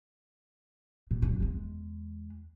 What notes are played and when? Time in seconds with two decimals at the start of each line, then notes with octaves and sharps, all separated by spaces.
1.11 A#2
1.22 C#2 F#2
1.40 E2 G#3